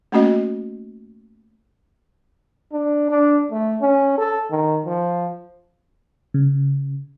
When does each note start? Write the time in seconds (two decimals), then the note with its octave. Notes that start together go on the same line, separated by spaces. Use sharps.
0.12 A3 A#3 C#4 F#4 D#5
2.72 D4
3.10 D4
3.51 A3
3.81 C#4
4.18 A4
4.51 D#3
4.86 F3
6.34 C#3